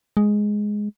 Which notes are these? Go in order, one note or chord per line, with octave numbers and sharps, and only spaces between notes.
G#3